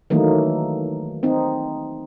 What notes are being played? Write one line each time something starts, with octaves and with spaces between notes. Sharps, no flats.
D#3 E3 F#3 A3 A#3 D#4
C4 D#4